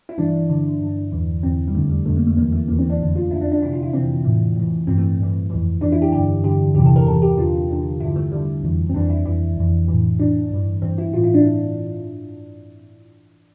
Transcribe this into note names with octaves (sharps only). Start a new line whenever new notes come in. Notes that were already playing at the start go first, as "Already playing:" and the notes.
E4
G2 E3 D4
G2 D3
G2 D3
E2 E3
E2 E3 C4
G3
F2 D3 A3
G3
F2 D3 A3
A#3
A3
E2 E3 A#3
A3
E2 E3 A#3
C4
D4
F2 D3
F4
F2 D3 E4
D4
D4
F2 C3 E3 E4
F4
E4
F2 C3 E3 C4
A2 E3
A2 E3
G2 E3 C4
A3
G2 E3
F2 E3
F2 E3 D4
E4
G4
G2 D3 G4
G2 D3 G4
E2 C3 E3 G4
A4
A#4
E2 C3 E3 A4
G4
E2 D3 F4
E2 D3
G2 D3 E4
A3
G2 D3 G3
F2 E3
C4
F2 E3 D4
E4
F2 E3 E4
F2 E3
A2 E3
A2 E3 D4
G2 E3
G2 E3 C4
E4
A2 E3 F4
E4
D4